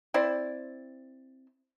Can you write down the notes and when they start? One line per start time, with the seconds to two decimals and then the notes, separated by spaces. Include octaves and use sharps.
0.14 C4 E4 C5 D5